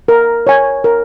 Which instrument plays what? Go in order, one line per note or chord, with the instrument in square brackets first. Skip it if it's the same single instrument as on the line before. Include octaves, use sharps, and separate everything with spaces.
[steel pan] A#4
C#5 G#5
A#4